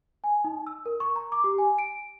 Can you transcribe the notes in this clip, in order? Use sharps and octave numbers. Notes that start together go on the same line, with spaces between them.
G#5
D#4
E6
A#4
C#6
A#5
D6
G4
G#5
D7